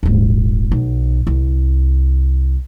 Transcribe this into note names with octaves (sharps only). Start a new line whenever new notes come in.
D#1 G#1
B1
C2